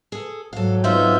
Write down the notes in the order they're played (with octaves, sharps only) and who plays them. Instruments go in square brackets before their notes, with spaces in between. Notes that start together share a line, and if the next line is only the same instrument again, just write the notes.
[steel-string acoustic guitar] G#4 A4
[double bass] G#2 F#3 [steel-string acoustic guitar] A4 F5
[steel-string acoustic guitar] B3 C4 D#4 [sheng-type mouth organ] F4 E5 G6